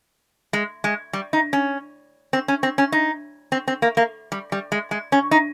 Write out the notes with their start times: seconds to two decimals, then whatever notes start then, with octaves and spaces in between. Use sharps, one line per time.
0.53 G#3
0.84 G#3
1.13 G3
1.33 D#4
1.53 C#4
2.33 C4
2.48 C#4
2.63 C4
2.78 C#4
2.92 D#4
3.52 C4
3.68 C4
3.82 A#3
3.97 A#3
4.32 G3
4.52 G3
4.72 G#3
4.91 G#3
5.12 C#4
5.31 D#4